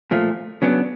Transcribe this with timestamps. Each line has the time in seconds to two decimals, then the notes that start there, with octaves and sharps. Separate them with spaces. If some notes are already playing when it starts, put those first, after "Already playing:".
0.11 A#2 F3 A3
0.62 C#3 F#3 B3 D4